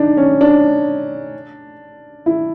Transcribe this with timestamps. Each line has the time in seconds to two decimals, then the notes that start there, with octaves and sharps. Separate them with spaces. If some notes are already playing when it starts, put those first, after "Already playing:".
Already playing: D4 D#4
0.17 C#4
0.41 D4
2.26 E4